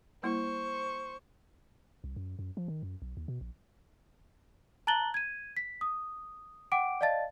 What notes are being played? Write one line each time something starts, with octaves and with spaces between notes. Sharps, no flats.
G3 A#3 E4 C5 C#6
C2
F#2
F#2
F3
D#3
F#2
B1
D#2
B2
A#1
A5 A#5 F#6 A6 F#7 G7
G#6 D#7
B6
D#6
F#5 G5 D6 D7
D5 D#5 F5 A5 A6